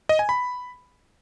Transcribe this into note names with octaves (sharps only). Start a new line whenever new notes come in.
D#5
G#5
B5